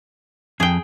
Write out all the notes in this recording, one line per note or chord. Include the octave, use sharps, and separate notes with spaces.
F2 G#4 G5